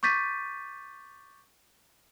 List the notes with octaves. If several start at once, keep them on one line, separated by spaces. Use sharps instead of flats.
C#6 D6 G6 A6 B6 D#7